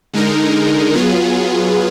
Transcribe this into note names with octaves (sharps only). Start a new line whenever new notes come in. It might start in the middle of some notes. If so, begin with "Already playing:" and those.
D3 G#3 D#4 A#4
F#3 B3 F4 G#4